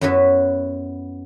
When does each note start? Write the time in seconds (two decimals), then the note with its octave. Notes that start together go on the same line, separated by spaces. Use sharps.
0.01 F#2 B3 E4 F#4 B4